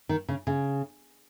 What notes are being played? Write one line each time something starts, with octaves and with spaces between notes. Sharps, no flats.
D#3
C#3
C#3